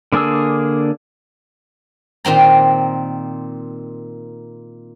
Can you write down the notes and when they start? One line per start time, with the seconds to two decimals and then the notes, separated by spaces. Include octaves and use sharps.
0.12 D3 A#3 D4 G#4 E6
2.25 A#2 D#3 C4 A#5